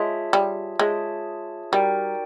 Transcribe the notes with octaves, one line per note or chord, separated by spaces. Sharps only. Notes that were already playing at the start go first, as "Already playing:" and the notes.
Already playing: G#3 F4 G#4 C#5 E5 A5
G3
G#3 F4 G#4 C#5 E5 A5
G3 D#4 F#4 A#4 D5 G5